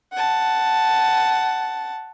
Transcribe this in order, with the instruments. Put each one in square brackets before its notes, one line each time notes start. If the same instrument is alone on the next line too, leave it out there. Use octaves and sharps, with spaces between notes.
[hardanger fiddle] F#5 A5